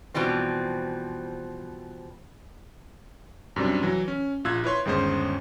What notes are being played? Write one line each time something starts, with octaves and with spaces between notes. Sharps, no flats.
B2 E3 F3 G3 C4
F#2 C3 G3 D4
E3 F#3
C#4
A#1 F4 E6 F#6 G#6
E4 B4 C#5 C6
G1 D#2 G#3 C#4 C5